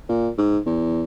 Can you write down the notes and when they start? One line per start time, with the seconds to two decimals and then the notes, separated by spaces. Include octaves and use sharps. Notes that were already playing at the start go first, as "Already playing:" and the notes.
0.09 A#2
0.38 G#2
0.66 E2